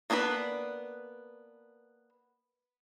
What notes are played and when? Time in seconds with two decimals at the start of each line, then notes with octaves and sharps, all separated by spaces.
0.10 A#3 B3 D4 G#4 B4